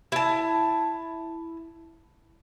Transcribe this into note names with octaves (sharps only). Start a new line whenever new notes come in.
E4 A5